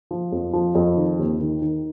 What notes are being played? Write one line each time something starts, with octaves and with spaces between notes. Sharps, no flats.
F3
F2
F3
F2
D#3
D#2
D#3
D#3